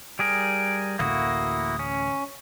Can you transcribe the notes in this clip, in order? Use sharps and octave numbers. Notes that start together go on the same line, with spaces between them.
G3 G#4 A#4 D7
A1 D2 A#3 E4 F#4 D#6
C#4